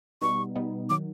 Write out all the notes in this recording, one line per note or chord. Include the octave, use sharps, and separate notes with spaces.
B2 G3 B3 D#4 C#6
B2 G3 B3 D#4
D#3 F#3 D6